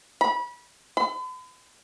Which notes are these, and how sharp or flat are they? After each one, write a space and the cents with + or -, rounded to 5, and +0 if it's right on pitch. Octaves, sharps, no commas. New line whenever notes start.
B5 -30
B5 +45